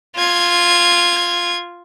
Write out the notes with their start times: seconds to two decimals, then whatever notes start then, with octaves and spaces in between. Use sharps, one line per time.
0.15 F4 G#6